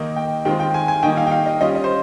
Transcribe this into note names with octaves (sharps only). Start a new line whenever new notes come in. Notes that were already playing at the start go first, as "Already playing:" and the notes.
Already playing: D#3 A#3 D#4
G5
D#3 G#3 C4 F4 G5
G5
G#5
G#5
D#3 G3 A#3 D#4 G5
F5
G5
F5
D#5
G3 C#4 F4 D#5
D#5
C5